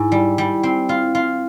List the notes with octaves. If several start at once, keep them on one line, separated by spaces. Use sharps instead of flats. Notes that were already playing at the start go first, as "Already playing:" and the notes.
Already playing: G#2 E4
G3
G3
C4
F4
F4